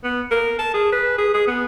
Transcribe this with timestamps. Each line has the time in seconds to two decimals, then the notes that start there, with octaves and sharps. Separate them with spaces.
0.04 B3
0.31 A#4
0.59 A5
0.74 G#4
0.92 B4
1.18 G#4
1.34 G#4
1.47 B3